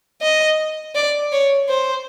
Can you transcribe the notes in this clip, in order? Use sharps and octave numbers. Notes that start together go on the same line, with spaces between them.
D#5
D5
C#5
C5